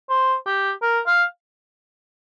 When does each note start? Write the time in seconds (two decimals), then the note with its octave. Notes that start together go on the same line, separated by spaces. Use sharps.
0.10 C5
0.46 G4
0.82 A#4
1.07 F5